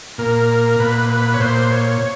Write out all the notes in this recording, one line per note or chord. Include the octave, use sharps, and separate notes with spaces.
A#2 A#4
A#2 B4
B4
C#5
A#2 C5
C#5